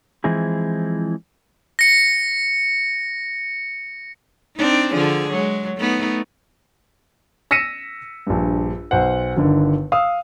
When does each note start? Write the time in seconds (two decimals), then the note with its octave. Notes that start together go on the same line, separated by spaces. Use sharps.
0.24 E3 F3 G#3 C4 E4 G#4
1.79 A#6 C#7
4.57 C4 D4 D#4
4.93 D3 F3 G#4
5.32 F#3 G#3
5.78 A3 B3 D#4
7.51 E6 A#6 B6 C#7 D#7 E7
8.27 A#1 G2
8.91 B1 C5 F#5
9.37 G1 D3 D#3
9.92 F5 D#6 E6